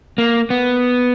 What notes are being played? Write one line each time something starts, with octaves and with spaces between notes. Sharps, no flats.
A#3
B3